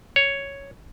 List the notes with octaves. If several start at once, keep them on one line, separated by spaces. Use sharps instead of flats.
C#5